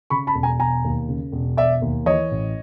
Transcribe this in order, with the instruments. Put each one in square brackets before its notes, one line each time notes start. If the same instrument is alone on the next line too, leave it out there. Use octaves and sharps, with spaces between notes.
[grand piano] C#3 B5 C#6
A5 B5
E1
G#5 A#5
E1 G#5 A#5
D#2
C#3
E1
E1 D5 E5
D#2
E3 C#5 D#5
A1